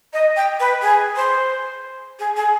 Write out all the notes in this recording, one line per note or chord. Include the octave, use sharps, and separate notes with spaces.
D#5
G5
B4
G#4
C5
G#4
G#4